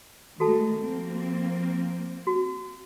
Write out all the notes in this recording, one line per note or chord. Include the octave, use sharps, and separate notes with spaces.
D#3 G#3 A3 F#4 A4 A5
F3 A#3 C4
F#4